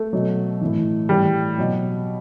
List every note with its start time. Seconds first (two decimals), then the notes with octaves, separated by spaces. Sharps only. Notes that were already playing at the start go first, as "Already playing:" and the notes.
Already playing: A3
0.13 B2 F#3
0.61 A2 E3
1.09 A2 E3 G3
1.58 B2 F#3